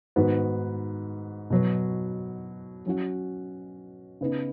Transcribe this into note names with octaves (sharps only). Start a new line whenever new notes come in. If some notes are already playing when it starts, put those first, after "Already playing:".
G#2 D#3 B3 F#4
B2 F#3 B3
F#3 C#4 F#4
C#3 B3 D#4